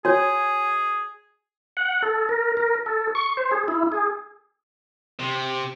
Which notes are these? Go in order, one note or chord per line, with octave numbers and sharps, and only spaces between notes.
F#4 G#4 C#5 G#5
F#5
A4
A#4
A#4
A4
C#6
C5
G#4
E4
G#4
C3